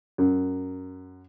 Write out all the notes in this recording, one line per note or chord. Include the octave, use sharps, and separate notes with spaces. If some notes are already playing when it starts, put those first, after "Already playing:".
F#2